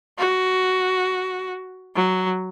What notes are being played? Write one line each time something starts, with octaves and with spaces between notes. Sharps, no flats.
F#4
F#3